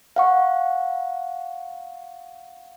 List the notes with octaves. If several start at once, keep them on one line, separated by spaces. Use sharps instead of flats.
F5 F#5 C#6